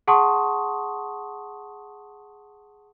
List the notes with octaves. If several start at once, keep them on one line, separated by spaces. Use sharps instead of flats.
G#4 F#5 A5 C6 C#6 D#6